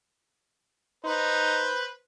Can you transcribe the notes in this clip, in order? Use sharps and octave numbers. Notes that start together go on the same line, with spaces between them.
D#4 B4 C5